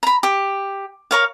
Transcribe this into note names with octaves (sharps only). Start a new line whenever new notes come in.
A#5 B5
G4
A#4 C#5 F5